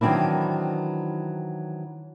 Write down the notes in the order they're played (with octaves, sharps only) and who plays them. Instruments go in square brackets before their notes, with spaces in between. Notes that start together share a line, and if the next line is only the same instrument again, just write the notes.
[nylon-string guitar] D#3 E3 F#3 C4 D4 E4